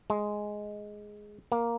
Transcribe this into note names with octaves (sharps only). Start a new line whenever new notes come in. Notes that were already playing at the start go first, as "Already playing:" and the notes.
G#3
A#3